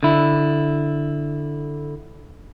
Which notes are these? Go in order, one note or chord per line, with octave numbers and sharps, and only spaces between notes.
D3 E4